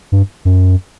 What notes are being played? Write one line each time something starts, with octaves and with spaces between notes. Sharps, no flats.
G2
F#2